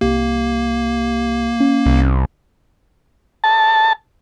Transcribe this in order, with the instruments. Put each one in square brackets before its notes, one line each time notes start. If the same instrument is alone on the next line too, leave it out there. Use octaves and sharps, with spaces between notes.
[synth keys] C2 G4 [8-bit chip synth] A#3
[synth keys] C#4
[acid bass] C2
[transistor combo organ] A5